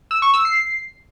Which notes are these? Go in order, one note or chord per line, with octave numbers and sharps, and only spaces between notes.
E6
C#6
E6
C7